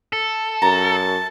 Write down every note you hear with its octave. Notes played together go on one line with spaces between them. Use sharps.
A4
F#2 A5 A#5